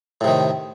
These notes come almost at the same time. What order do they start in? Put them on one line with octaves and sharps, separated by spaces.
A2 C3 D#3